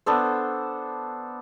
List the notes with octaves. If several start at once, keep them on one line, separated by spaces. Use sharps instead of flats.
B3 D4 A4 C5